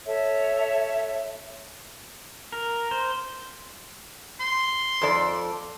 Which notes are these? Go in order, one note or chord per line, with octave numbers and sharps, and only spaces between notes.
A4 C#5 E5
A#4
C5
C6
F2 A4 D5